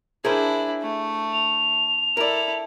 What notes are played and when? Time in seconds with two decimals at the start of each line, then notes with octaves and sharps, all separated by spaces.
0.25 D4 E4 G#4 A#4 C5
0.82 A3
1.33 F7
2.17 E4 A4 A#4 D5